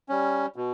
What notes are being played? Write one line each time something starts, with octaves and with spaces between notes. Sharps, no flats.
G3 C#4
B2